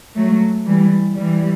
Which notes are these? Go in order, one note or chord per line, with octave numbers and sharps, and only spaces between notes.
F#3 A3
E3 G3
E3 G3